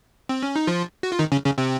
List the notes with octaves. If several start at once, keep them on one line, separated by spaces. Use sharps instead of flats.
C4
C#4
D#4
F3 F4
F#4
F4
D#3 D#4
C#3 C#4
C#3 C#4
C3 C4